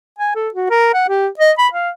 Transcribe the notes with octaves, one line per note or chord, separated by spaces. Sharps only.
G#5
A4
F#4
A#4
F#5
G4
D#5
B5
F5